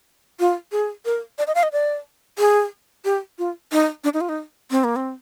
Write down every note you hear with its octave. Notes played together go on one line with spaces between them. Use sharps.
F4
G#4
A#4
D5
D#5
F5
D#5
D5
G#4
G4
F4
D#4
D4
D#4
F4
D#4
C4
A#3
C4